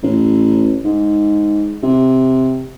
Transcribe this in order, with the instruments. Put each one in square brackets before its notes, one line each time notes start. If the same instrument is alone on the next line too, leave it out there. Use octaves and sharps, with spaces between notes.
[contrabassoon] A1
G#2
C3